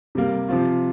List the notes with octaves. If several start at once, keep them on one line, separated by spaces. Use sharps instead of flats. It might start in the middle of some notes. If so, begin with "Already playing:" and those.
C3 G3 A#3
C3 F3 C4 F4